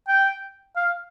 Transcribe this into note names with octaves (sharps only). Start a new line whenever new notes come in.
G5
F5